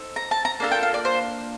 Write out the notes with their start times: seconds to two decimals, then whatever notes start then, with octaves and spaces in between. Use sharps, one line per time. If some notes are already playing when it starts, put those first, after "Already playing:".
Already playing: C4 D#4 A4
0.16 A#5
0.31 A5
0.45 A#5
0.60 A#3 D4 F4 A4
0.71 G5
0.83 F5
0.94 D5
1.05 C5